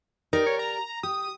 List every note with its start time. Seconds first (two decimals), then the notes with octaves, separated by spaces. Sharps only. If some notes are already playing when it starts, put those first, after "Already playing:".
0.33 D#4 G4 A#4 D5
0.47 C#5
0.59 A#5
1.03 G4 D#6